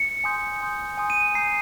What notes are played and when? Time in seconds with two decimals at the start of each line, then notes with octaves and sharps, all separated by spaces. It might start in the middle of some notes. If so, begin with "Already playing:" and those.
Already playing: C#7
0.24 G#5 C6 D#6 G6
0.61 G#5 C6 D#6 G6
0.98 G#5 C6 D#6 G6
1.10 D#7
1.35 A#5 D#6 G6 C7